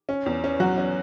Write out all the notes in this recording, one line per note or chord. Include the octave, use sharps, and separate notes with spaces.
C#4
E2
C#4
F#3 F#4
C#4